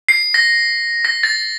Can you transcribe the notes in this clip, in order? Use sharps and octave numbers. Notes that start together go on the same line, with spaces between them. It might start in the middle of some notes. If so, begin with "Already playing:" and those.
C7
A#6
A#6
A6